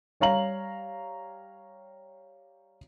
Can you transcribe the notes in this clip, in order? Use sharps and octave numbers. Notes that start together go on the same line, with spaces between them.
G3 C#5 F5 A#5 F#7